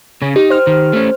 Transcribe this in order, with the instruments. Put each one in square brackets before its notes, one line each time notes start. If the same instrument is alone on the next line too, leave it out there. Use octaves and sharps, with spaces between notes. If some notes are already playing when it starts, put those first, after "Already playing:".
[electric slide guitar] C#3 C#4
[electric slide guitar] D#4 [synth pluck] G4
[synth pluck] C5 F6
[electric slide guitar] D#3
A3 C#4